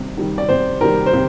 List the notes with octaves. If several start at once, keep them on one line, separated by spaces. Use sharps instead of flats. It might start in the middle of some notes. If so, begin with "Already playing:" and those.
Already playing: C3 D#3 G3
D#3 G3
D5
C3 C5
D#3 G3 A#4
C5
C3